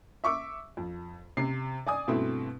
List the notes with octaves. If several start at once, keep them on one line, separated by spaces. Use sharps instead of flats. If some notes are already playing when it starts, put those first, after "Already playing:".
E5 C#6 D6 E6
F2
C3 C7
D5 G#5 D#6
G2 B2 A3 C4 E4